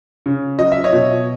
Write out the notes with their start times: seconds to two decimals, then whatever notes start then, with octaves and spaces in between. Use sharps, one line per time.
0.26 C#3
0.59 F#3 D#5
0.72 E5
0.84 C#5 D#5
0.93 B2